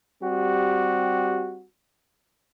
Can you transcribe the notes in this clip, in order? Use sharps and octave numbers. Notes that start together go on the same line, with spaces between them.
G3 C4 F#4 G4